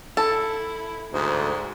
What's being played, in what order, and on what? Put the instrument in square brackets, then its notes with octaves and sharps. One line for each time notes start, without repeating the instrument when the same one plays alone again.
[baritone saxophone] E4 [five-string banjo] A4
[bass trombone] D2 [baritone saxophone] G#2